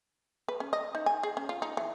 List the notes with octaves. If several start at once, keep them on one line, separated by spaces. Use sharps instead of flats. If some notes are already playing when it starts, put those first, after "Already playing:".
B4
C#4
D#5
D#4
G#5
G#4
C#4
F4
D#4
E3